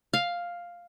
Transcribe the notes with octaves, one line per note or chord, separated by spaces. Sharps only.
F5